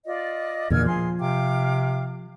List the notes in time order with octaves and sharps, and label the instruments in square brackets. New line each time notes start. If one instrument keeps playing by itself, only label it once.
[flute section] F4 D5 D#5
[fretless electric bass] E2 A#2 D3 [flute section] E6 F6 G#6
[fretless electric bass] F3 [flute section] G#4 C6
[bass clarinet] C3 [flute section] F5 G5 D6